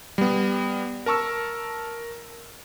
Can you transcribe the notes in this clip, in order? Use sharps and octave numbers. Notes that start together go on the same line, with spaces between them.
G3 B3
A#4 A5 C#6 E6